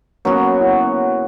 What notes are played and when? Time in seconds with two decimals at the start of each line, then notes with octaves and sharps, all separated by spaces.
0.25 F#3 A#3 B3 C#4 F#4
0.61 C#4 E4